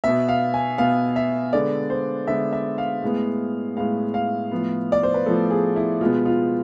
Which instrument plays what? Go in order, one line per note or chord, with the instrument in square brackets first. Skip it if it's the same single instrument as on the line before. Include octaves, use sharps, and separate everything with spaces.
[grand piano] B2 B3 E5
F5
G#5
B2 B3 F5
E5
D3 G#3 B3 D5
C5
D3 G#3 B3 E5
E5
F5
A2 G#3 B3
A2 G#3 B3 F5
F5
A2 F3 B3
D5
C5
B4
A2 F3 B3 A4
G#4
E4
B2 G#3 B3 F4
F4